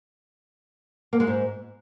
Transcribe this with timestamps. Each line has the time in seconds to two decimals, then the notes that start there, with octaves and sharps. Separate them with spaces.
1.13 A#3
1.20 G#3
1.27 G#2